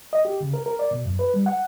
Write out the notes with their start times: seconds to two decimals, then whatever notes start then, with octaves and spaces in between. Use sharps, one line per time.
0.13 D#5
0.25 G4
0.41 C#3
0.54 A#4
0.66 A#4
0.79 D5
0.91 B2
1.05 F#2
1.19 B4
1.34 G3
1.46 F#5